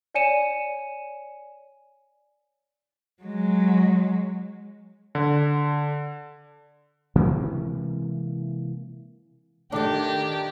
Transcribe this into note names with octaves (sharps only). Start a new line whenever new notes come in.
C#5 D5 G#5 C#7 D#7 E7
F#3 G#3
D3
C3 E3 G#3 A#3
D#3 A3 D4 G4 A4